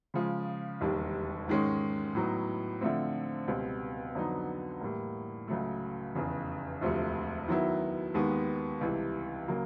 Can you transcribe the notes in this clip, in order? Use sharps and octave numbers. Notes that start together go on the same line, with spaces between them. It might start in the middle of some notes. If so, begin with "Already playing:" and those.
C#3 F3 G#3
E1 D#2 D#3 G3
G#2 D#3 G#3 C#4
A2 F#3 B3 D#4
D3 F3 A3 C4
C#2 B2 G3 C4
F2 D3 F#3 B3 D#4
A2 E3 G3 A#3
C#2 C#3 F#3 A3
F1 E2 C#3
E1 D2 C3 F3 A3
D#3 F#3 B3 E4
D#2 D#3 G#3 B3
C#2 C3 E3 G3
C#3 F#3 A#3